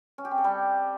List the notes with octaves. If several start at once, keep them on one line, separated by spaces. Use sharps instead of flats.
C#4
G4
C4
A4
G3